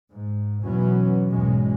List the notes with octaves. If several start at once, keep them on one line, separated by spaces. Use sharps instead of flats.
G#2
E2 B2 E3 F#3 B3 C#4
B1 E2 G#2 B2 G#3 C#4